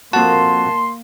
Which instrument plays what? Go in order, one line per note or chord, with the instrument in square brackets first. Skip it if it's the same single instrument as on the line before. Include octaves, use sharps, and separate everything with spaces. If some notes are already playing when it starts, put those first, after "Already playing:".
[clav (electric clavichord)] F2 F#4 [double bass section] A#3 [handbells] A5 [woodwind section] C6